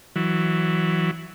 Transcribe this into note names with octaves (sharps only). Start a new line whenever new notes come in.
E3 F#3